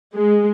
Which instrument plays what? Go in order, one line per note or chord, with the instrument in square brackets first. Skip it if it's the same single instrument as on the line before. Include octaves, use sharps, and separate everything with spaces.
[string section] G#3